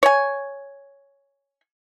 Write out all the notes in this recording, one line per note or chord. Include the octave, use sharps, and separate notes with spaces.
C#5 G#5